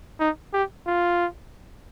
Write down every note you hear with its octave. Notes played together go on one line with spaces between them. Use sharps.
D#4
G4
F4